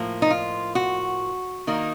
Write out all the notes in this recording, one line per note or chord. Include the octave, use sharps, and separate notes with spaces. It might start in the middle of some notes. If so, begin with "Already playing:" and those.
Already playing: A2 F3 A#3
D#4
F4
F#4
D#3 A#3 D#4